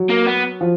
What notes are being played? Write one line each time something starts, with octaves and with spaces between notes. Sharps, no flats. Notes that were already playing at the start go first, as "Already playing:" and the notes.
Already playing: F#3
A#3
B3
F3